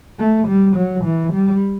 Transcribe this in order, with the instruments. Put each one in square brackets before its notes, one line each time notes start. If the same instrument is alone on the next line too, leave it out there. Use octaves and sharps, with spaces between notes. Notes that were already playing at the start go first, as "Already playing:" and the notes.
[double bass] A3
G3
F#3
E3
G3